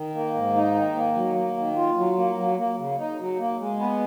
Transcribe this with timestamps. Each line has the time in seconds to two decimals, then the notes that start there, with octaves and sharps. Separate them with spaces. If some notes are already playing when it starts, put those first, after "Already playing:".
Already playing: D#3
0.15 A#3
0.34 G#2
0.55 D#4
0.74 D#3
0.95 A#3
1.15 F#3
1.36 A#3
1.57 D#3
1.76 F4
1.97 F#3
2.17 A#3
2.37 F#3
2.58 A#3
2.78 C#3
2.98 D#4
3.19 F#3
3.39 A#3
3.59 G#3
3.79 B3